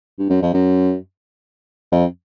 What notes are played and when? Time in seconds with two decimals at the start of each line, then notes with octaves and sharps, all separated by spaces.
0.19 G2
0.30 F#2
0.42 F2
0.54 F#2
1.92 F2